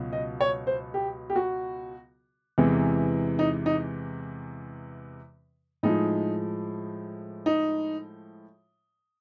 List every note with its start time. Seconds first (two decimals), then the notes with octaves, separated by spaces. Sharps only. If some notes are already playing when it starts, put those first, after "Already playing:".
Already playing: C#2 B2 F#3
0.13 D#5
0.41 C#5
0.67 C5
0.94 G4
1.30 G4
1.36 F#4
2.58 E2 C3 E3 G#3
3.39 D#4
3.66 D#4
5.83 A2 F3 G#3 D#4
7.46 D#4